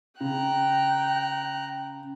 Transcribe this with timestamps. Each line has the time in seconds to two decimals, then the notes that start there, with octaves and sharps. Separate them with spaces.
0.20 C#3 G5 A#5 F#6